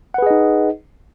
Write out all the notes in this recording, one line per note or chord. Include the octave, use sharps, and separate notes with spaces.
D#4 G#4 B4 D#5 F#5